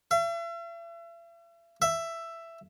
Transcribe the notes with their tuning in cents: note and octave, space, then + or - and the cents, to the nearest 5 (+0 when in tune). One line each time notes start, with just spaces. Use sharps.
E5 +40
E5 +10